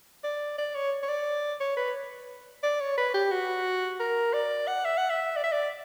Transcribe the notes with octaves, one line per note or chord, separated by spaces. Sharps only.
D5
D5
C#5
C#5
D5
C#5
B4
D5
C#5
B4
G4
F#4
A#4
D5
F#5
E5
F#5
E5
D5
E5
D5